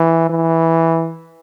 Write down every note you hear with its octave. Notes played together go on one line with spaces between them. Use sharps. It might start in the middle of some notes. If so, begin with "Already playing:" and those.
Already playing: E3
E3